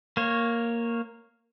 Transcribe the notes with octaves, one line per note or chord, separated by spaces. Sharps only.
A#3 C#5